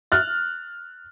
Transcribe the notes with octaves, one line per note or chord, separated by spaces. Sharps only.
F6 F#6 A6